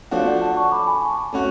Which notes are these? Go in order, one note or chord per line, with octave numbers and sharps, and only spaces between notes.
F3 A3 D4 F#4 C#5 F5
D5 F#5
F#5 A5
A5 C#6
B5 D6
G#5 B5
A5 C#6
A3 C#4 F#4